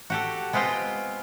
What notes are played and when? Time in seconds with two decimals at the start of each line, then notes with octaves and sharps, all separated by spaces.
0.10 F#4 G4 A4
0.53 G#3 B3 C4 F4 D#5 G5